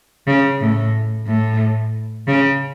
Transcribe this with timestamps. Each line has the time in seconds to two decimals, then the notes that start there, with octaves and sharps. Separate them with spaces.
0.27 C#3
0.60 A2
1.27 A2
2.27 C#3